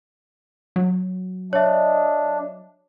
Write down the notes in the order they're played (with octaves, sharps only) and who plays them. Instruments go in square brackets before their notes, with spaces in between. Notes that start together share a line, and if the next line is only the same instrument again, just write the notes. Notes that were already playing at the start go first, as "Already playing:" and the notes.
[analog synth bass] F#3
[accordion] D4 [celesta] C#5 E5 [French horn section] D#5